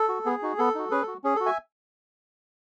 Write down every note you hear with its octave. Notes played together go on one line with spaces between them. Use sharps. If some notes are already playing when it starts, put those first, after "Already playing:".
Already playing: A4
F#4
B3 G#4
D#4 F#4
B3 A4
D#4 F#4
C#4 G#4 B4
A4
F#4
C#4 G#4
F#4 A4
E5 G#5